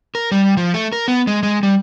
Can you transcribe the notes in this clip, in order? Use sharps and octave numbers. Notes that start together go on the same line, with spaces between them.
A#4
G3
F3
A3
A#4
B3
G#3
G#3
G3